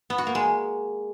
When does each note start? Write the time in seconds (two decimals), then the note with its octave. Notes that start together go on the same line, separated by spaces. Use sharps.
0.10 B3
0.18 F#4
0.27 A#3
0.35 G#3